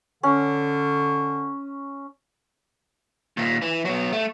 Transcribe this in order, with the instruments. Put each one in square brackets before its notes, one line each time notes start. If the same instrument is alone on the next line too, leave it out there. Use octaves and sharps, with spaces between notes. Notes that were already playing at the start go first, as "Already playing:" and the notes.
[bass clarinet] D3 [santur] C#4
[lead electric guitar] D#2 A#2
E3
F#3 B3
A3